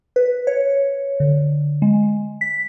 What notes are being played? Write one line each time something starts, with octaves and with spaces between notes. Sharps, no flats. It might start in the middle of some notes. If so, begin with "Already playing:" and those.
B4
C#5
D3
G#3
B6